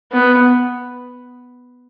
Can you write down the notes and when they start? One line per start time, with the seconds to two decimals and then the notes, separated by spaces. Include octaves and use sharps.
0.13 B3